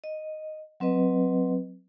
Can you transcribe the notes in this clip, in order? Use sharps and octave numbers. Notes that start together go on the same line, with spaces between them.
D#5
F#3 C4 B4 D#5